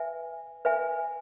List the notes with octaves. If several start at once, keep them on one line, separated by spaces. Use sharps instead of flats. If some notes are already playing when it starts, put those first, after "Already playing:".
Already playing: B4 E5 G#5
B4 E5 G#5